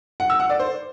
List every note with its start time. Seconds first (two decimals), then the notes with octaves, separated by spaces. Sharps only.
0.20 F#5
0.30 E6
0.40 F#5
0.50 D5
0.59 C5